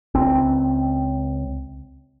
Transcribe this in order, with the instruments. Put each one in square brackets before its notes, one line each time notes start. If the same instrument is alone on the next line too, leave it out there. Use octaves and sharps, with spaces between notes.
[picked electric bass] C#2 C4